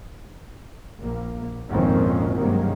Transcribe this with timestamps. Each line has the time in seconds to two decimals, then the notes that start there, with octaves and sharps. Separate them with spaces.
1.00 A#1 A#3
1.70 G#1 F2 A#2 D#3 C4 C#4
2.38 G2 C3 D#3 F#3 G#3 A#3